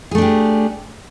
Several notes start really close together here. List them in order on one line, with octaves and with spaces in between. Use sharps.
G#4 A3 D4 G4